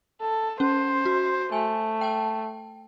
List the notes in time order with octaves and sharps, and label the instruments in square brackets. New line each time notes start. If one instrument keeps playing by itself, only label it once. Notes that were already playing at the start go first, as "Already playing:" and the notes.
[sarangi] A4
[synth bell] C#4 [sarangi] C5
[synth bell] F#4
[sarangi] A3 [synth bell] G#5
[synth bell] G5 A5